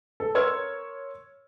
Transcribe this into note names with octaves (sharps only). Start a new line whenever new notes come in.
A4
A#4 C#5 C6 E6 F6 G#6